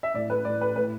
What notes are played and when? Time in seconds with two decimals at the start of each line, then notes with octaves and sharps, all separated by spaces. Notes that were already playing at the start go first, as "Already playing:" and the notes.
0.03 E5
0.14 A2 D5
0.30 B4
0.45 A2 D5
0.61 B4
0.76 A2 B4